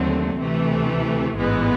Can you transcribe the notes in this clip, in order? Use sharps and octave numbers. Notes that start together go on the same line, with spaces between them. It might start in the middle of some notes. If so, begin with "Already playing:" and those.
Already playing: D#2 D3 F#3 A3 C4
D2 C3 E3 A3
A1 G#2 E3 G#3 B3